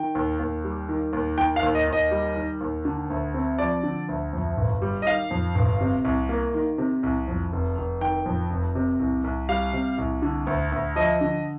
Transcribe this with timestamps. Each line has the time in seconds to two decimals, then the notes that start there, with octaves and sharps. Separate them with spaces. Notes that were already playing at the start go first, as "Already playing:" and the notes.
Already playing: D#3 G5
0.15 D#2
0.39 D#2
0.64 G3
0.89 D#3
1.13 D#2
1.38 D#3 G5
1.56 F5
1.63 D#2
1.75 D#5
1.87 D#2
1.93 D#5
2.11 G3
2.36 D#3
2.61 D#2
2.85 D3
3.10 D2
3.34 C4
3.59 F3 D5
3.83 D3
4.09 D2
4.33 F2
4.57 G1
4.82 G3
5.02 D#5
5.07 D#3 F5
5.31 F2
5.55 G1
5.81 C3
6.05 C2
6.29 A#3
6.54 D#3
6.78 C3
7.03 C2
7.28 F2
7.53 F1
7.77 F1
8.01 D#3 G5
8.26 F2
8.50 F1
8.75 C3
9.00 C2
9.24 C2
9.49 G3 F5
9.73 C3
9.98 C2
10.22 D3
10.47 D2
10.72 D2
10.96 F3 D#5
11.21 D3